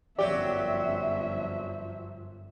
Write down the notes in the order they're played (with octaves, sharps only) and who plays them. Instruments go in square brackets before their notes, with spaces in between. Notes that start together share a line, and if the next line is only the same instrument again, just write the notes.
[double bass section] G1 F#2 F3 [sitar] F#3 G4 [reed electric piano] D5 [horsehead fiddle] E5